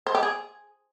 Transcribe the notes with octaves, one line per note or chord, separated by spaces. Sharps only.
C5
G4
G#4